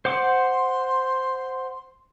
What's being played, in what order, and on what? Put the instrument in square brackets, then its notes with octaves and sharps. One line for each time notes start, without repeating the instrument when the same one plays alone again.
[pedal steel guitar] C5 F#5 D6 [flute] C6